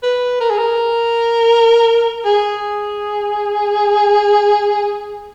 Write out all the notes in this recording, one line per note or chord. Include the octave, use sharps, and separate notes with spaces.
B4
A#4
G#4
A#4
G#4